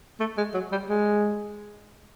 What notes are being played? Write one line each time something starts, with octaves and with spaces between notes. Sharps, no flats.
A3
G#3
F#3
G3
G#3